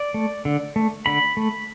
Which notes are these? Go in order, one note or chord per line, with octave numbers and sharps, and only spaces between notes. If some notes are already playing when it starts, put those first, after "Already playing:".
Already playing: D5
A3
D3
A3
D3 B5
A3